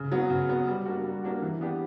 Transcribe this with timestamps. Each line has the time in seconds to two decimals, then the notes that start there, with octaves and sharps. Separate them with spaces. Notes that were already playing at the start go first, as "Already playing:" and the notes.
Already playing: C#3
0.12 F#3 B3
0.30 C#3
0.49 F#3 B3
0.67 G3
0.86 A#3 D4 F#4
1.04 G3
1.24 A#3 D4 F#4
1.42 E3
1.61 B3 D4 G4